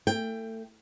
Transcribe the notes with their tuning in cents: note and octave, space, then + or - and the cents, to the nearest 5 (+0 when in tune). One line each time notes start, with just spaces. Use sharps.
A3 +25 G5 +10